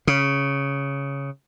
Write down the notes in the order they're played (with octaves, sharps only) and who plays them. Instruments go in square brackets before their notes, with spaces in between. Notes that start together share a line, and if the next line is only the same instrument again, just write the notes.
[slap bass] C#3